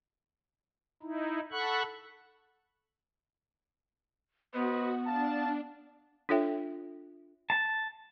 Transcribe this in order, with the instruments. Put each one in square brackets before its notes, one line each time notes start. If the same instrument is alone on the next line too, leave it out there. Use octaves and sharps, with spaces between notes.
[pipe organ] D#4 E4
A4 F#5 B5 C#6 F#6
[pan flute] B3 [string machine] F#4 [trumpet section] B4 C5 D#5
[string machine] D4 [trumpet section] F5 A5
[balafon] D4 F4 A4 C#5 E5 G5
[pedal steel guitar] A5